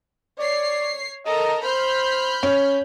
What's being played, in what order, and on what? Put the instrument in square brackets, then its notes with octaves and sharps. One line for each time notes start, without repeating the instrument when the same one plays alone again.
[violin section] C#5 C7 [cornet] D5
[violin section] A4 A#4 A#5 [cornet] D#5
[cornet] C5 [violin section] B5 F6 G6
[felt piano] C#4